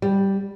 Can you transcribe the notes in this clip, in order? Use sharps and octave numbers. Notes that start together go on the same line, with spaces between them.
G3